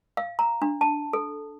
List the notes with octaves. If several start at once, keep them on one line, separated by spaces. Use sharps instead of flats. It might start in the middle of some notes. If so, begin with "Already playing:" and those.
F5
A#5
D4
A5
A4